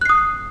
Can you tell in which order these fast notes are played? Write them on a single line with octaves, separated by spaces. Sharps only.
F#6 C7 D#6